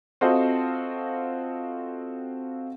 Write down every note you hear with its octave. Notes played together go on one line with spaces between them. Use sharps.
C4 F4 F#4 A4 C5 D#5